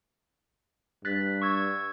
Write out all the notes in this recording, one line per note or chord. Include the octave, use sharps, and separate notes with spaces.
G2 F#6 A6 B6
C#6 E6 G#6